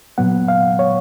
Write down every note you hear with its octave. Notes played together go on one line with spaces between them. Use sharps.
A#2 F#3 B3 F#5
F5
C#5